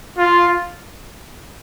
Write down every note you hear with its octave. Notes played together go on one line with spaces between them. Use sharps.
F4